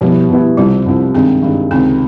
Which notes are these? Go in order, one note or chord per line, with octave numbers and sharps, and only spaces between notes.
B2 F3 G3 B3 E4
B2 G3 B3 E4
C2 C3 F3 G3
C2 C3 F3
G2 D#3 G#3 C4
G2 D#3 G#3
C#2 C3 D#3 C4